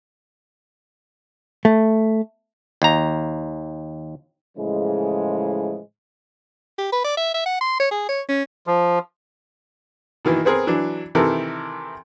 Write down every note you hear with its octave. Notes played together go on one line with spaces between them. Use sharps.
A3
D#2 A#5
A2 C#3 E3 F3 G#3
G4
B4
D5
E5
E5
F#5
C6
C#5
G#4
C#5
C#4
F3
B2 D#3 E3 A#3
B3 C4 G#4 A#4
E3 F#3 D4
C3 D#3 E3 A4 A#4